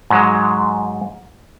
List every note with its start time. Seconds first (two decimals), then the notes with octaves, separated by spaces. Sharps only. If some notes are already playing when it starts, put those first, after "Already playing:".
0.10 G#2 F#3 G#3